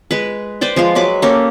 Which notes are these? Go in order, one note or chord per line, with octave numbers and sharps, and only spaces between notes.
G#3 B4
B4 C5 D5 G5
F3 G#3 F4 F5
F#3 G#3 B4 D6
A#3 C#4 G4 A4